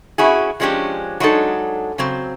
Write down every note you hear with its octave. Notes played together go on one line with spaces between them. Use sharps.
C#4 E4 F#4 G#4
F3 G#3 C#4 D4 G4
F#3 G#3 D4 D#4 A4
C#3 F#3 C4